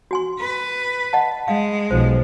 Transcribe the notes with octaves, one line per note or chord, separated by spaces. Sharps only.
F#4 G#5 C6
B4
D#5 F#5 A5
G#3 F5
B1 F3 C5